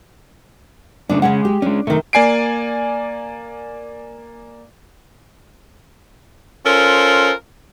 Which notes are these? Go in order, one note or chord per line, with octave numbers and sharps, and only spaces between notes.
G#2 C#3 A3 D4
C#3 G#3 C#4 F#5
G4
G#3 C#4 D4
C3 D#3 A3
A#3 D5 G#5 C7 D7
C#4 F4 A4 A#4 C5